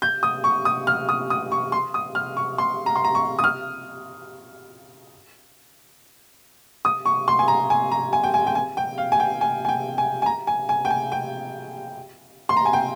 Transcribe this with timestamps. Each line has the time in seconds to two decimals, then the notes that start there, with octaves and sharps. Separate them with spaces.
0.02 G6
0.23 D#6
0.44 C#6
0.65 D#6
0.87 F6
1.09 D#6
1.30 D#6
1.52 C#6
1.72 C6
1.94 D#6
2.15 F6
2.37 C#6
2.58 C6
2.86 A#5
2.96 C6
3.04 A#5
3.15 C#6
3.39 D#6
3.44 F6
6.85 D#6
7.05 C#6
7.28 C6
7.39 G#5
7.48 A#5
7.70 G#5
7.91 A#5
8.13 G#5
8.24 G5
8.34 G#5
8.47 G5
8.55 G#5
8.77 G5
8.98 F5
9.12 G#5
9.20 G5
9.41 G#5
9.65 G#5
9.69 G5
9.98 G#5
10.22 G#5
10.26 A#5
10.47 G#5
10.69 G#5
10.85 G5
10.90 G#5
11.12 G5
12.49 C6
12.57 A#5
12.65 G#5
12.73 G5